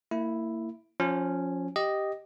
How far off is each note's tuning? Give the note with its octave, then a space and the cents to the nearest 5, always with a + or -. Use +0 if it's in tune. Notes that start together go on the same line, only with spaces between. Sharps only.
A#3 -30 E4 +0
F3 +25 C#4 +0
G4 +0 D#5 +0